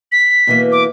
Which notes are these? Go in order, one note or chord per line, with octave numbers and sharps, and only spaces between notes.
B6
B2 E3 A#3
D6